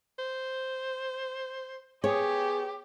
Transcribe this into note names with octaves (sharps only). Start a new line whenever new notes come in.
C5
B3 G4 G#4 C#5